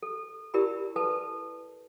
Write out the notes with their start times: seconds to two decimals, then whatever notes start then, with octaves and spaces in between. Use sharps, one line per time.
0.03 A4
0.54 E4 G4 A#4 D5 B5
0.96 A4 B4 A5